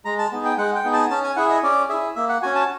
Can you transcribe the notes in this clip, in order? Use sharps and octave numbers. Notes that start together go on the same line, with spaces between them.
G#3 A#5
A5
B3 D#4 G#4
G5
G#3 F#5
G5
B3 D#4 G#4
A5
C#4 A5
G#5
E4 G#4 F#5
D#5
C#4 D5
E4 G#4 E5
A#3 E5
F#5
C#4 F#4 G#5
A5